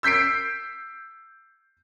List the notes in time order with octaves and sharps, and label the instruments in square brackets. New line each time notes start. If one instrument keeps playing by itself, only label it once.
[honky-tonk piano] E6 G6 B6 C7 D7